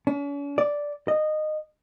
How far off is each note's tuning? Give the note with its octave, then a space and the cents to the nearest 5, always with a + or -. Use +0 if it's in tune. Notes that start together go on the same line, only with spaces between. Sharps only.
C#4 +45
D5 -5
D#5 -15